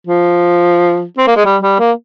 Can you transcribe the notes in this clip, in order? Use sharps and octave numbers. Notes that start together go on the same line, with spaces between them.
F3
C4
A#3
G#3
G3
G3
A#3